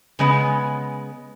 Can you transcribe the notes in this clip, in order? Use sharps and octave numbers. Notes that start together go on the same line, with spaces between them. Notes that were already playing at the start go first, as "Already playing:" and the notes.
C#3 G#3 B3